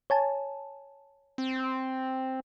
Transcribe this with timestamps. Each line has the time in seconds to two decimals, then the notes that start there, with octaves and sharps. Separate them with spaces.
0.10 C#5 G#5 A5
1.38 C4